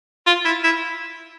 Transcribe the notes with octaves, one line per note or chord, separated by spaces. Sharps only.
F4
E4
E4